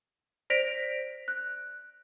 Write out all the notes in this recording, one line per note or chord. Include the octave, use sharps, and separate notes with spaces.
C5 D5 A#6 B6 D7 F7
F#6